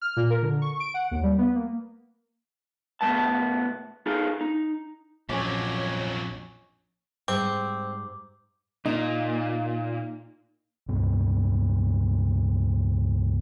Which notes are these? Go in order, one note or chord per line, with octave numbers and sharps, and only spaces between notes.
F6
A#2
A#4
D3
C#6
D7
F#5
D#2
G3
B3
A#3
B1 F#2 D#3 A3 B3 A5
D#4 F4 G#4 A4
D#4
A#1 F2 F#3 C#4 C#5 D6
G#2 G3 C4 D6
A#2 D#4
C#2 G2